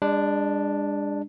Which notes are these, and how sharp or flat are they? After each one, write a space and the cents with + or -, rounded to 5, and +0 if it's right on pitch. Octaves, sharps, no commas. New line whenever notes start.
G#3 -40 D4 +0